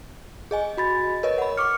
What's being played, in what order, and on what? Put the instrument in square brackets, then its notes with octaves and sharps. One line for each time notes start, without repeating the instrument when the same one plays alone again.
[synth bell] G#4 D#5 G#5
[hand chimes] F#4 B5 A6
[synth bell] A#4 B4 D#5 [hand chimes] C#5
[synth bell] F#5 B5
[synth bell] C#6 C#7 [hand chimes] D6 F6